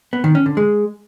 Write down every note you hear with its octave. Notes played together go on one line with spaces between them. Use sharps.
B3
D#3
C#4
D3
G#3